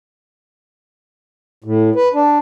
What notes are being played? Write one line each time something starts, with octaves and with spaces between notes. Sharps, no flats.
A2
B4
D4